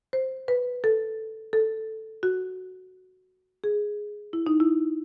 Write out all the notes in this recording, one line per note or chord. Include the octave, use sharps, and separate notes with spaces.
C5
B4
A4
A4
F#4
G#4
E4
D#4
E4